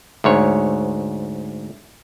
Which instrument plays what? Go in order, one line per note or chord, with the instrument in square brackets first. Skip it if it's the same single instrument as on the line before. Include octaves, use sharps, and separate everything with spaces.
[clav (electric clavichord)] D2 G#2 C#5